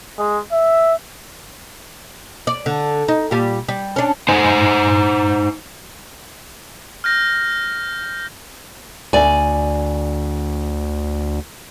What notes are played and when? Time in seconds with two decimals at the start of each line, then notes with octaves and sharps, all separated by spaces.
0.19 G#3
0.52 E5
2.47 D5
2.66 D3
3.08 D#4
3.31 A#2 G3
3.69 G3
3.96 C#4 D4
4.29 D#4 C5 F#5 G#5
7.04 F6 G6 A#6
9.13 D2 D5 G#5